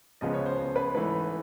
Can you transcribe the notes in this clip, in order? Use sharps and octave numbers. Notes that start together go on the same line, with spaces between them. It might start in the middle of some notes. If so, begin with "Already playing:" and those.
C#2 C#3 F3 G#3 B3 D#5
C#5
C5
C5
B4
G#2 E3 A3 B4